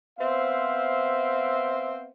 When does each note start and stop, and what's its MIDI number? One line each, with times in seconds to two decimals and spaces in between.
0.19 2.08 59
0.19 2.08 60
0.19 2.08 72
0.19 2.08 76
0.19 2.08 77